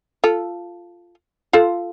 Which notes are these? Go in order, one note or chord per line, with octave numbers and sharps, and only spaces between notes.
F4 A4
F4 A4